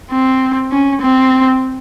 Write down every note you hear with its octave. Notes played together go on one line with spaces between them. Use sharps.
C4
C#4
C4